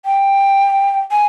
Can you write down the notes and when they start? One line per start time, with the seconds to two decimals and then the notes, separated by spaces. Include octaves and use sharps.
0.05 G5
1.11 G#5